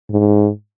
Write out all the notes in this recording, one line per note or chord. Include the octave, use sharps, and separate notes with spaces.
G#2